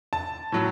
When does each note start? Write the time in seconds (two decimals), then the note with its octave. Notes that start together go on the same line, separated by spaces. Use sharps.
0.13 A5
0.52 A2 F#3